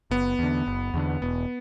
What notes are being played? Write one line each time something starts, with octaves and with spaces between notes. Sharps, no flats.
F#1 B3
E2 D3
F#1
E2 D3
E1 B3